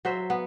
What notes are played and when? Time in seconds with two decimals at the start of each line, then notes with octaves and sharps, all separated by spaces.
0.05 F#3 C5 E5
0.30 B3